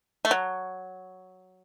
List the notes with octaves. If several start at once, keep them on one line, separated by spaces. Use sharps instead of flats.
A3
F#3